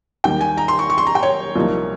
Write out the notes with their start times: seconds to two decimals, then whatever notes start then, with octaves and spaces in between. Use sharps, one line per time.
0.24 D#2 D#3 G3 G5
0.41 G#5
0.57 A#5
0.68 C6
0.79 C#6
0.90 C#6
0.98 C6
1.07 A#5
1.15 G5
1.23 C#5
1.56 C2 A#2 F3 A#3 D#4